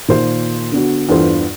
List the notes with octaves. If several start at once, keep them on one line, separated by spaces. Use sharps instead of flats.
A#2 D#3 C5
D3 B3 F#4
E2 G2 F4 A4 C5